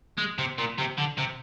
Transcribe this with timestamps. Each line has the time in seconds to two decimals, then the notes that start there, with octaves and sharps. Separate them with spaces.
0.18 G#3
0.39 C3
0.59 A#2
0.79 C3
0.98 D3
1.18 C3